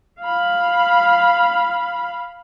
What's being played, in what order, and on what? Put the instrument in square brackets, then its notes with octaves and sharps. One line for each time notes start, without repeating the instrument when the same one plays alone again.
[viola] F5 B5